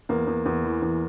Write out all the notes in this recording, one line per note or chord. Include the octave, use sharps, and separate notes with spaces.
E2 A#3 A#4
E2
E2
E3
E2